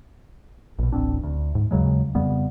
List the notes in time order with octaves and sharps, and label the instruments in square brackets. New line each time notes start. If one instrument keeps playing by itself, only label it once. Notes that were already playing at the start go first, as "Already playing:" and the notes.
[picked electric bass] A#1 B2
D1 A1 C4 D4
D2
G#2
D#2 C#3 F#3 G#3
F2 C#3 G3 B3